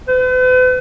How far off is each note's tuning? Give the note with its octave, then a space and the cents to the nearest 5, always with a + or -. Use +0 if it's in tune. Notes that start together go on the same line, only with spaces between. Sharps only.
B4 +45